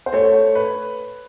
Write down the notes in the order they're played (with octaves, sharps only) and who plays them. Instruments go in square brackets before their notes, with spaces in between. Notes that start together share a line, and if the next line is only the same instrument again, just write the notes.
[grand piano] C5
[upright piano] A3 [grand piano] C#5
[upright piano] B4